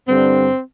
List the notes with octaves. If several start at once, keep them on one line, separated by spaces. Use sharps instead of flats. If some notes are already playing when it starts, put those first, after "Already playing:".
G2 D3 G3 C4